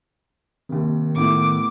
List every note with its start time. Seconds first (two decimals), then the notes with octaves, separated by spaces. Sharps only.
0.69 D#2 C3 D#3
1.15 A2 B3 E4 D6